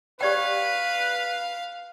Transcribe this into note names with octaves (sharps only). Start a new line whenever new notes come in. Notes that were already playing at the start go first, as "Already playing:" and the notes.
G4 B4 D5 F5 G5